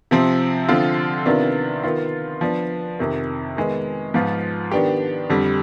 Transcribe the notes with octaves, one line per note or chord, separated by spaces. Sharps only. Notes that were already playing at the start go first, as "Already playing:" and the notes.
C3 F3 C4
D3 F3 C4 F4
C3 D#3 B3 D4 F4
D#3 B3 F4
F3 B3 D4
F2 C3 D#3
D#3 G#3 B3
G#2 F3 B3 F4
D#3 B3 D4 G4
F2 D3 G3